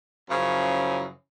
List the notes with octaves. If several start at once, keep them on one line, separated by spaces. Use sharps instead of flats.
F#2 C#3 F3 E4